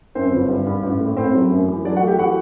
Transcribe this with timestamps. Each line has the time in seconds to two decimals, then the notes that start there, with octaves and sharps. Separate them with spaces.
0.15 F#2 C4 C5
0.32 G1
0.49 G2
0.67 G2
0.83 A1
1.00 A2
1.17 A2 C4 C5
1.34 F#3
1.51 F#2
1.68 E3
1.85 F#3 D4 D5
1.96 F#4 F#5
2.02 A3
2.07 G4 G5
2.19 E3 F#4 F#5